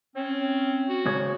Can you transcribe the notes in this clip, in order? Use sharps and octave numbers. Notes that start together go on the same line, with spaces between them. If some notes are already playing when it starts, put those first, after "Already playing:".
C4 C#4
F#4
G#2 C#3 C#5